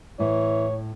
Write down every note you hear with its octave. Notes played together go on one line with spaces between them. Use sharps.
A2 E3 C#5